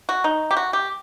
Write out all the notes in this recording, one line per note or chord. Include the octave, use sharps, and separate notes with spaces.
F#4
D#4
G4
F#4
G4